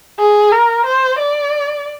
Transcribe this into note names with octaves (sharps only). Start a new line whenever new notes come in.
G#4
A#4
C5
D5